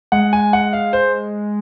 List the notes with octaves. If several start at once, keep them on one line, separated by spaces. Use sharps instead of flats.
G#3 F#5
G#5
F#5
F5
C5